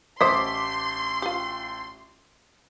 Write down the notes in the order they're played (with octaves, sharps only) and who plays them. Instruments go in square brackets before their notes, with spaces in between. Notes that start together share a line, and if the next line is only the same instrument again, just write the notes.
[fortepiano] A1 [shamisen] C5 D#5 [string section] C6 [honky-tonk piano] D6 B6
[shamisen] F4 G4